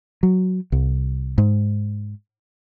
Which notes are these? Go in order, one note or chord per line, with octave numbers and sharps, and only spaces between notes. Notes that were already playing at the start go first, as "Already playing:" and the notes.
F#3
C2
G#2